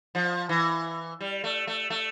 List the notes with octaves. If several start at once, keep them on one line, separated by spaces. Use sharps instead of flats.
F3
E3
G3
A3
A3
A3